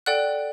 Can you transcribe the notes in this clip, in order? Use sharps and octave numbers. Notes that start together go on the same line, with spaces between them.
A4 D5 F#5 G5 F#6